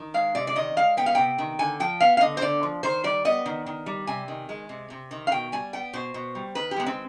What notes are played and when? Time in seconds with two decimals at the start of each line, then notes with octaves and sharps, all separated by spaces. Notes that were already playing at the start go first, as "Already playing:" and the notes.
Already playing: D#3
0.14 G#3 F5
0.35 C3 D5
0.47 D5
0.56 D#3 D#5
0.77 G#3 F5
0.97 B3 G5
1.06 F5
1.15 C3 G5
1.38 D#3
1.59 D3 G#5
1.80 F3 G5
2.01 B3 F5
2.17 F5
2.21 D3 D#5
2.37 C5
2.41 D3 D5
2.63 F3
2.83 D#3 C5
3.04 G3 D5
3.25 B3 D#5
3.46 D#3
3.66 D#3
3.86 G3
4.07 C3 G#5
4.28 D#3
4.49 G#3
4.69 C3
4.90 C3
5.11 D#3
5.27 F5
5.31 B2 G5
5.52 G3 G#5
5.73 B3 G5
5.93 B2 C5
6.14 B2
6.35 G3
6.55 D#3 B4
6.71 G4
6.76 G#3 B3
6.86 C4